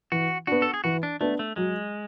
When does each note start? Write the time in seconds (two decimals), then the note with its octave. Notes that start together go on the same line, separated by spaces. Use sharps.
0.12 E3 F#4
0.47 B3 D4 F#4
0.62 A4
0.74 G#4
0.84 E3 F#4
1.03 D4
1.20 A3 B3 D4
1.39 A3
1.56 F#3 G#3